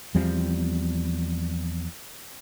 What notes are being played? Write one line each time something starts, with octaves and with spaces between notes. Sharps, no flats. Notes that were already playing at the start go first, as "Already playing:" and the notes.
E2 F3 G3 C4